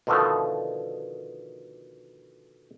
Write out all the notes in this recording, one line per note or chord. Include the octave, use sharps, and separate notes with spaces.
B2 D3 D#3 F3 A3